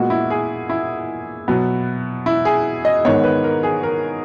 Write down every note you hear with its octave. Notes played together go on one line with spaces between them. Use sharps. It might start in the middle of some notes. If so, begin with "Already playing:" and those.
Already playing: A#2 G#3 B3 F#4
E4
G#4
E4
B2 F#3 B3
E4
G#4
D#5
G#2 D#3 G#3 B3 C#5
B4
A#4
G#4
A#4